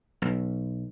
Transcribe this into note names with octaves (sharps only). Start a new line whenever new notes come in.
B1